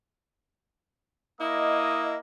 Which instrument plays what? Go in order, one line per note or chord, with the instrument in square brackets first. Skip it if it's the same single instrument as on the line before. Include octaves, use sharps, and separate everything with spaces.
[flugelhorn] A#3 [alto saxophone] E4 [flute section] D#5 [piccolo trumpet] D#6